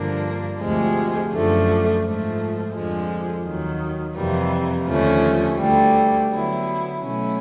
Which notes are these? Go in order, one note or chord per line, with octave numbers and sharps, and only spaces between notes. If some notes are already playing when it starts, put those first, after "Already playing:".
Already playing: G2 D3 F3 A#3 D4
D2 C3 F3 G#3
F#2 D3 F3 A3
G#2 F3 A3
F2 D3 F3 G#3
D#2 D#3 F#3
F2 C3 E3 G3 A#3
D#2 D3 F3 A3 C#4
D2 D3 G3
D3 F#3 B3 E4
B2 F#3 A3 C#4 E4